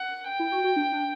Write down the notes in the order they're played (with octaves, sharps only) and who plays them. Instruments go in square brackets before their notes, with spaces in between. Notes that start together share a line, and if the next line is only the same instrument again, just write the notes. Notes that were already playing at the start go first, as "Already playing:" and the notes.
Already playing: [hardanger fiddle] F#5
G5
[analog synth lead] E4
F#4
F#4
D4
D4